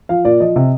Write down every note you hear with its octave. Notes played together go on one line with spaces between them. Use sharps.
F3 F5
A#2 D5
F3 D#5
C3